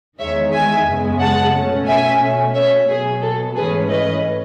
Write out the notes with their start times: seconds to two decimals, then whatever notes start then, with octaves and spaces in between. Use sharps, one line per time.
0.19 E2 D#3 G#3 C#5 E5
0.52 E5 G#5
0.86 F#2 C#3 G#3 B3
1.20 F#5 A5
1.53 B2 A3 C#4
1.87 E5 G#5
2.20 B2 A3 C#4
2.54 C#5 E5
2.88 B2 F#3 B3 G#4
3.22 A4
3.55 G#2 E3 A3 C#4 G#4 B4
3.89 B4 D#5